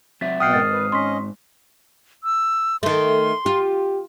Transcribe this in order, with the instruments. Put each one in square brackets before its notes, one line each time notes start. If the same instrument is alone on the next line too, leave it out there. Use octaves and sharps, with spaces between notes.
[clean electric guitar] F#3 C4 E5 [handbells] A6 [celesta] B6
[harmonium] B2 F#5 G5 [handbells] D#6 F6 C7
[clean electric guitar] G#2 C4 [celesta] A#4 D#5 A6
[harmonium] B4
[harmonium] C#4 D#5 [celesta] C6 C#6 B6
[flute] E6
[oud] D#3 A3 [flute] C6
[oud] F4 [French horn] G4